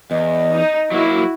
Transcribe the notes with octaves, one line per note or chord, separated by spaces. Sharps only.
E2 D#5
D#4
F#3 A#3 E4 F#4